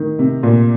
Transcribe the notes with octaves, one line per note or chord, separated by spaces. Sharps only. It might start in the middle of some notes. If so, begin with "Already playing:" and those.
Already playing: D#3
C3
A#2